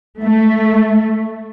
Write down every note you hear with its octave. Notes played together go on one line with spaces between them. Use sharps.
A3